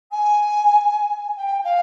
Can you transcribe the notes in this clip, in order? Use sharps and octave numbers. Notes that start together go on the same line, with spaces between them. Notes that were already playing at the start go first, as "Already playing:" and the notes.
G#5
G5
F5